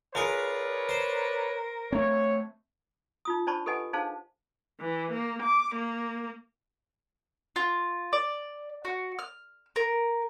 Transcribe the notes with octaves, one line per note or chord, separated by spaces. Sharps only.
F4 G#4 A#4 B4 C#5 D5
C5
A3 C4 C#5
D#4 F4 D#6
D4 C5 D5 A5 B5 C#6
G4 A4 B4 D#5 F#5 G#5
D4 D#4 G#4 C5 F5 A5
E3
A#3
D6
A#3
F4
D5
F#4
F6
A#4